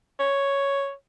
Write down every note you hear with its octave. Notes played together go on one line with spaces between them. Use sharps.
C#5